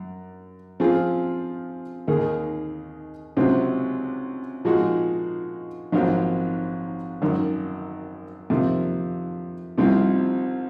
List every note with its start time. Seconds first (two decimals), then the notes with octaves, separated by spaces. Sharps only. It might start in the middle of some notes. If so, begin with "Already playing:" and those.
Already playing: F#2
0.80 F3 C4 F4 G#4
2.08 D#2 D#3 A#3 D#4 G#4
3.37 C#2 C3 F#3 C4
4.65 A#2 F3 G#3 D#4 F#4
5.92 A#1 G#2 D#3 F#3 C4
7.22 G#1 F#2 D#3
8.50 F2 C3 D#3
9.78 C2 C3 F3 C4 D#4